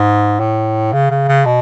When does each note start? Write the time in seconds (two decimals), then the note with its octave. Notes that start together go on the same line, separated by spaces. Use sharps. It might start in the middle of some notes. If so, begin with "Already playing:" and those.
Already playing: G#2
0.40 A2
0.93 C#3
1.11 C#3
1.28 C#3
1.45 B2